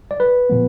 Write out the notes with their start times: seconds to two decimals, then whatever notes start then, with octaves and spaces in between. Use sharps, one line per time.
0.11 D5
0.20 B4
0.50 A#2 F3 B3